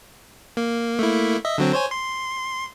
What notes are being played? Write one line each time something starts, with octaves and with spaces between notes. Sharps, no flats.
A#3
A3 A#3 E4
D#5 E5
D3 F#3 C4
C5 C#5 G#5
C6